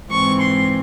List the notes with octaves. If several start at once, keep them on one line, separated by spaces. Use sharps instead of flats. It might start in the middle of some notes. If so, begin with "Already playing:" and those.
G#2 E3 C4 C#6
C6